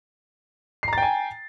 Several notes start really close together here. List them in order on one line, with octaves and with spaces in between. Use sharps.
C7 A#5 A6 G5 G#5